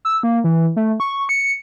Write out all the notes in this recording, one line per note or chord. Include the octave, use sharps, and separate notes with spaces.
E6
A#3
E3
A3
C#6
C#7